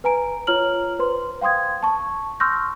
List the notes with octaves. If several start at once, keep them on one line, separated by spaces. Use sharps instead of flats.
B4 G#5 A#5 D7
F4 C#5 A#5 F6 F#7
B4 C5 C6
F5 G5 C6 D#6 G#6
A5 C#6
C6 C#6 E6 F6 G6 A#6